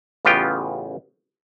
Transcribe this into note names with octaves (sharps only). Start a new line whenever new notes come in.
A1 C#3 B3 F4 G4 G5